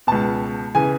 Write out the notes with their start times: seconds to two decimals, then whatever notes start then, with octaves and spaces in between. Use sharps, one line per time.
0.07 C#2 B2 A5
0.75 C#3 E3 G#5